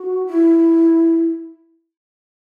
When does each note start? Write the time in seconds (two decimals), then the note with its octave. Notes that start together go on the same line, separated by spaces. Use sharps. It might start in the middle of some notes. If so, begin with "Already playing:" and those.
Already playing: F#4
0.26 E4